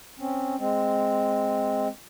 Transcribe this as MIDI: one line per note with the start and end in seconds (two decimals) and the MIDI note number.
0.19 0.56 60
0.19 0.56 61
0.59 1.88 56
0.59 1.88 60